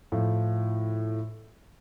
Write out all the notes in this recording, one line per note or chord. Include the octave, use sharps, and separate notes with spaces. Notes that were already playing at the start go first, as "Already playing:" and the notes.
A2 F3